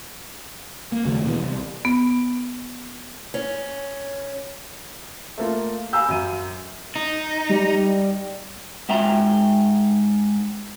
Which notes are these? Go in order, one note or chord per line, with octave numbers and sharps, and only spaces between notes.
A#3
D#2 C#3 F#3 A3
B2 E3 A#3 B3
C2
B3
C#4
A3 A#3 F4
F5 G#5 A#5 B5 E6 G6
F#2 D#7
D#4
G3
G#2 E5 G5 A#5